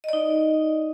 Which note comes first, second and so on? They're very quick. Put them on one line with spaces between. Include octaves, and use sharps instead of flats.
D#5 D5 D#4